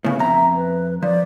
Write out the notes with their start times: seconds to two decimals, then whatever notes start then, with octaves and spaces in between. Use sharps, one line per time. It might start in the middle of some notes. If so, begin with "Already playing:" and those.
0.04 A2 C#3 B3
0.19 F2 E5 A#5
0.56 B4
1.02 F3 D5